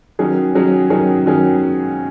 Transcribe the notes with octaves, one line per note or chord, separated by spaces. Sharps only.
D#3 F#3 C#4 G#4
D#3 F#3 C#4 G#4
D#3 F#3 C#4 G#4
D#3 F#3 C#4 G#4